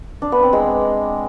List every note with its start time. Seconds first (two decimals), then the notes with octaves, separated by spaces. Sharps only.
0.22 D4
0.32 B3
0.42 C4
0.53 G#3